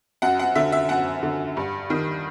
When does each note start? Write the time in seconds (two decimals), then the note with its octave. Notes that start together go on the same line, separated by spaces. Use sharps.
0.22 F#2 F#5
0.39 F#5
0.55 D3 E5
0.72 E5
0.89 F#2 F#5
1.23 D3
1.57 G2
1.90 D#3